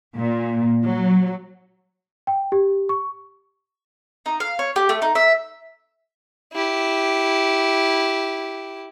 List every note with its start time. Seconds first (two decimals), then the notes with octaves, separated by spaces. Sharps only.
0.17 A#2
0.85 F#3
2.27 G5
2.52 G4
2.89 C#6
4.26 D#4
4.40 F5
4.59 C#5
4.76 G4
4.89 A3
5.02 D#4
5.15 E5
6.53 E4 G4